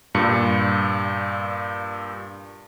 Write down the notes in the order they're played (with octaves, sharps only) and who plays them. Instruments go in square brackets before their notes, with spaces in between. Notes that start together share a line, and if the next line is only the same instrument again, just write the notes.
[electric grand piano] G2 A#2 C#7